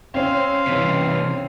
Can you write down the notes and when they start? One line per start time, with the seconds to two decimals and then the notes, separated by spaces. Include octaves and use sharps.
0.14 C4 C#4 F5 C6
0.67 C3 E3